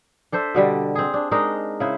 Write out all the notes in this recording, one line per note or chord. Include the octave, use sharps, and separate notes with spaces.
D4 A4 C5 E5
B2 D3 G3
C4 G#4
D4
G#3 D4 D#4 A#4
C#3 E4 C5